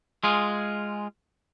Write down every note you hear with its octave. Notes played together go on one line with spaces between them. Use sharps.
G#3 F4 G#4